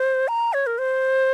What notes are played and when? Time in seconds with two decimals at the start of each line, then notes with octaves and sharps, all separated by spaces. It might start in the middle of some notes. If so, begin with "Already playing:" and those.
Already playing: C5
0.28 A#5
0.53 C#5
0.67 A#4
0.78 C5